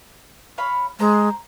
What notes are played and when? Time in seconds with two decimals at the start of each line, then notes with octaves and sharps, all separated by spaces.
0.58 C#5 F5 B5
1.00 G#3 C5 A#5